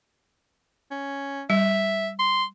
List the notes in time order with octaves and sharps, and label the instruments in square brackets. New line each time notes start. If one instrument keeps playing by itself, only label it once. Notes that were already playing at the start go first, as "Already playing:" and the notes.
[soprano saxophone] C#4
[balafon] G3 [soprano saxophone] E5
[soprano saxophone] C6